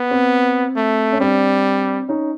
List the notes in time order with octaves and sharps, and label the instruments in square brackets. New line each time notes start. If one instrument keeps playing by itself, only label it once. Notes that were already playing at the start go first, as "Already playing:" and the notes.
Already playing: [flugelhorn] B3
[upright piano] C4
[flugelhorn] A3
[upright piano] C#4
[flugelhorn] G3 [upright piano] C4 D4
[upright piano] C#4 D#4